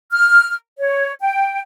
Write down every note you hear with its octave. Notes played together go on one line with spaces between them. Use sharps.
F6
C#5
G5